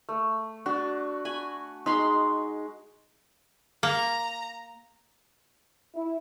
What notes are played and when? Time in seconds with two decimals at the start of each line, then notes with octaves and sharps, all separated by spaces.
0.09 A3
0.66 D4 F#4
1.25 G#5 B5
1.86 G#3 D#4 B5 C6
3.83 A#3 A#5
5.95 E4